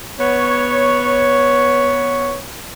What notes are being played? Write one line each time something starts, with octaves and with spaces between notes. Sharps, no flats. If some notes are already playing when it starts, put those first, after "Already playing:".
B3 C#5